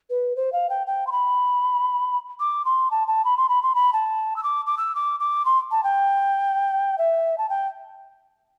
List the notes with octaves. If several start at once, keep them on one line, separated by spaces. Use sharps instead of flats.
B4
C5
F5
G5
G5
C6
B5
D6
C6
A5
A5
B5
C6
B5
C6
B5
A5
E6
D6
D6
E6
D6
D6
C6
A5
G5
E5
A5
G5